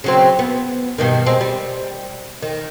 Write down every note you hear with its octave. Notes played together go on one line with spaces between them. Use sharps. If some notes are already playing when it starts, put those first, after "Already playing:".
C#3 F#3 C4
B3
G2 B2 D#3
G#3 C4
G3
D#3